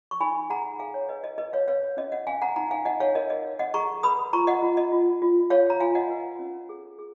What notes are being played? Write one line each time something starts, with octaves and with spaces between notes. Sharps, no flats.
C#6
D#4 G#5 B5
G#4 F#5 A#5
G#4 F5 G#5
C#5
B4 D#5
D#5
B4 D#5
C#5 F5
B4 C#5 F5
C#5
C#4 D#5
D#5 F#5
C#4 F5 G#5
F#5 A#5
D#4 F#5 A#5
F5 G#5
D#4 D#5 F#5
C#5 F5
A#4 D#5
D#5
C#5
D#5 F#5
G#4 A#5 C#6
B4 B5 D#6
F4 A#5 C#6
D#5 F#5
F4
D#5
F4
F4
F4 C#5 F5
A#5
F4 F5 G#5
D#5 F#5
B4
C#4
G#4
G#4